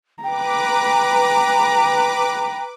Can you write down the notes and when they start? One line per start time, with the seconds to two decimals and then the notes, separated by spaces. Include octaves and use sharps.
0.24 B4 G5 A#5 D6